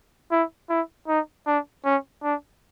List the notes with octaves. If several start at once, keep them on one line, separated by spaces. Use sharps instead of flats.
E4
E4
D#4
D4
C#4
D4